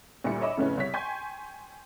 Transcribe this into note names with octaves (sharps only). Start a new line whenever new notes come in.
D2 A#2 G3 E4 C#7
C#5 D#5 E5 B5 D6
F2 A2 C#3 B3 C#4 E4
C2 C#5 B6
G5 G#5 C6 C#6 G6 G#6